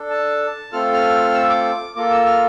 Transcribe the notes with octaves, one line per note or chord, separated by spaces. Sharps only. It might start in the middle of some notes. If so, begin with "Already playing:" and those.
Already playing: D4 A4
A5
A3 C4 F4 A4 F6
F6
E6
D6
A#3 F4 A4 D6
E6
F6